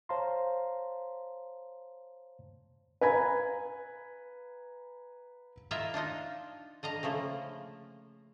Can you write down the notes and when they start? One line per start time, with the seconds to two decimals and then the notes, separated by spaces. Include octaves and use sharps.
0.09 C5 C#5 F5 A5 A#5 C6
3.01 B4 F5 G#5 A#5 B5 G#6
5.71 E4 F4 A#4 D#5 E5
5.94 D4 D#4 F4 D#5
6.83 D3 D#5 F5 A#5
7.03 C#3 F3 A3 A#3